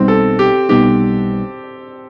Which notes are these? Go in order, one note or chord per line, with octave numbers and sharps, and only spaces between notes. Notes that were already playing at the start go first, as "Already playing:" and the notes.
Already playing: B1 B2 G3 B3 C4 D#4
A4
G4
B1 B2 G3 B3 D#4 G4